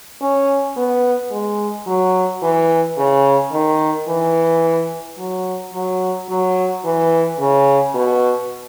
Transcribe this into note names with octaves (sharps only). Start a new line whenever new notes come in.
C#4
B3
G#3
F#3
E3
C#3
D#3
E3
F#3
F#3
F#3
E3
C#3
B2